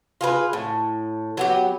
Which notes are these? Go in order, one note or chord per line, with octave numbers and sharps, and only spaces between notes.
F4 G#4 B4
A2
F#3 B3 G4